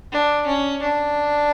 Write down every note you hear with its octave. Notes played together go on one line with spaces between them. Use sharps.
D4
C#4
D4